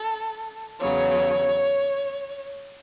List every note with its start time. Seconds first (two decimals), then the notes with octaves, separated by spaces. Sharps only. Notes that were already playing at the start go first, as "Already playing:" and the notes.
Already playing: A4
0.80 E2 C#3 F#3 C#5